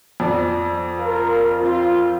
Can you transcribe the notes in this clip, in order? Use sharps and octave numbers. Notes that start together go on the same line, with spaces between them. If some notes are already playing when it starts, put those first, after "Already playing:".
F2 D5
F4 A#4
C4 F4